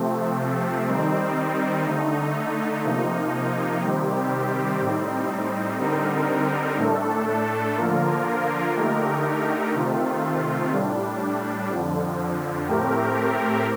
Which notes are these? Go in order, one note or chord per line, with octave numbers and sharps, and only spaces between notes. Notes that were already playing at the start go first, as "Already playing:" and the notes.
Already playing: C3 F3 A3 C4
D#3 G3 C4 D#4
D3 A3 D#4
C3 F3 A#3 D#4
C3 D#3 G3 C4 G4
A2 G3 C4 D#4
D3 G3 C4 D#4 A#4
A2 A3 D4 A4
D3 F3 A#3 F4 A#4
D3 A3 D#4 G4 A#4
C3 D#3 A3 C4 F4
A2 G3 D4
F2 D3 F3
A2 A3 C4 G4 A#4